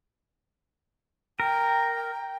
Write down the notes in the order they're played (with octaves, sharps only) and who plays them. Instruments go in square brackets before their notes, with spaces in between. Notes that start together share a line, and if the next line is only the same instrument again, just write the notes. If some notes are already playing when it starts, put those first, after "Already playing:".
[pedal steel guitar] A#4 [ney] G5